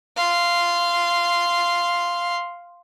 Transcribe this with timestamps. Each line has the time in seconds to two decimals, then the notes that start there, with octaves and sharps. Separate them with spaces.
0.17 F5 C6